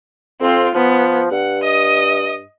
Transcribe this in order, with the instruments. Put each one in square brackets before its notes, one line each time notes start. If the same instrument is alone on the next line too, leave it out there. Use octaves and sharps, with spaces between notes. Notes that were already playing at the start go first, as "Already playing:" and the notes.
[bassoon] F2 [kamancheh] C4 F4
[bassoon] F3 [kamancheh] B3
[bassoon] G2 [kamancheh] F#5
[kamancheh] D#5 D#6